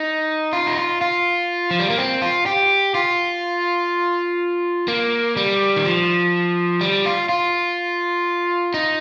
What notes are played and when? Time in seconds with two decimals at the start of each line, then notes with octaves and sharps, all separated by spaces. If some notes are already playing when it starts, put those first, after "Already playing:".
Already playing: D#4
0.53 F4
0.67 D#4
0.77 F4
1.01 F4
1.71 F3
1.80 G3
1.90 A#3
1.98 C4
2.22 F4
2.46 G4
2.95 F4
4.88 A#3
5.37 G3
5.76 D#3
5.85 F3
6.81 G3
7.06 F4
7.29 F4
8.74 D#4